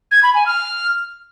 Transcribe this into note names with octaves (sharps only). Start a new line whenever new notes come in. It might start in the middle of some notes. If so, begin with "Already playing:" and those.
G#6
B5
G#5
F6